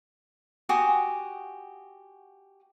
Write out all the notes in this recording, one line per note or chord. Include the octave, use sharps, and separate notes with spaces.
F#4 G4 G#5 D#6